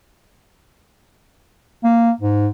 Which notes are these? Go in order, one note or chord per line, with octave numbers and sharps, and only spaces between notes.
A#3
G#2